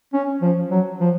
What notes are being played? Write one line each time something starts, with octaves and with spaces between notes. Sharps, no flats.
C#4
F3
F#3
F3